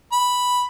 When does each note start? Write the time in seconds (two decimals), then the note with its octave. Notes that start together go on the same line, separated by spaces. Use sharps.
0.12 B5